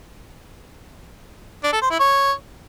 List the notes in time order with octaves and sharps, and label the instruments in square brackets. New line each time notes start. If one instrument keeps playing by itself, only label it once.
[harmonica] D4
A4
C5
E4
C#5